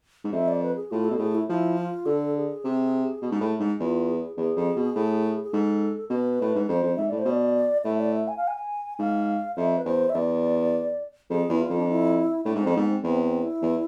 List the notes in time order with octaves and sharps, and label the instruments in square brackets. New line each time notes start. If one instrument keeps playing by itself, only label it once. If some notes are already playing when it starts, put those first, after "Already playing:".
[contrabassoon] G#2
[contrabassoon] F2 [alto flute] E5
[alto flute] D5
B4
G#4
[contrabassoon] A2 [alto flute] F4
[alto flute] A4
[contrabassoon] B2
[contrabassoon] A2 [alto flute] G#4
[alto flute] E4
[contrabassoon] F3 [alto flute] E4
[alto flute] F4
[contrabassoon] D3 [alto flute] A4
[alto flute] G#4
[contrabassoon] C3
B2
G#2
A2
G#2
[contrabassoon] E2 [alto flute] F4
[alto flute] G#4
[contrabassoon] E2 [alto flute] G#4
[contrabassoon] F2
B2
A2
[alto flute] G#4
[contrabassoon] G#2 [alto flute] A4
[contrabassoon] B2 [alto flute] B4
[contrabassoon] A2
G#2
[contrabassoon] F2 [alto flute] C5
[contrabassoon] F2
[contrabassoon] G#2 [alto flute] E5
[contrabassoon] A2 [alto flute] D5
[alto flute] C5
[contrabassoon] B2 [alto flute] D5
[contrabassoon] A2 [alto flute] E5
[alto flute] D5
E5
G#5
F5
G#5
[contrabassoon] G#2 [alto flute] F5
[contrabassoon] F2 [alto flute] E5
[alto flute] B4
[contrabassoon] E2 [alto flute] C5
[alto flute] E5
[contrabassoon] E2 [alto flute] D5
[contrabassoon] F2 [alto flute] G#4
[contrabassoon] E2 [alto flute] E4
[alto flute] F4
[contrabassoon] F2
[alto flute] D4
E4
[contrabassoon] A2 [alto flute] D4
[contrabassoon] G#2 [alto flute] C4
[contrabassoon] F2
[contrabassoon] G#2 [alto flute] B3
[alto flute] C4
[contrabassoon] E2 [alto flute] C4
[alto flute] C4
E4
[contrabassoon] E2